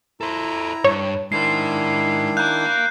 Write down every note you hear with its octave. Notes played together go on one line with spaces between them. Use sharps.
E4 A4 C5 A#5
G2 C#5
D#3 G#3 D4 E4 C5 C7
F5 A#5 F#6 G6